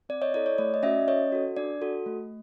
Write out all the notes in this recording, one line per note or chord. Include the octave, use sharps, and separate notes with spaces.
C4 D5
C#5 D#5
E4 A4 D5
C#5
A3 D5
D#5
C#4 F#4 D5 E5
C#4 C#5 D#5
F#4 A4
D4 D5
F#4 A4
A3